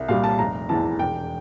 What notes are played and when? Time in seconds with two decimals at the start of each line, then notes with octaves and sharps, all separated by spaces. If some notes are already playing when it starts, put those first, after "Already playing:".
Already playing: C2 E5
0.08 A#2 G3 F5
0.24 A5
0.39 F1 A#5
0.69 E2 E3 A5
0.99 E1 G5